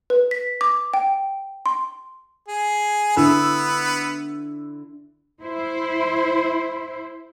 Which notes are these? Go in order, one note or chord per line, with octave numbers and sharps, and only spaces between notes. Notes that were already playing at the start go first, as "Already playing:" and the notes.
B4
B6
D6
G5
C6
G#4
D3 B3 E4 E6
E4 C5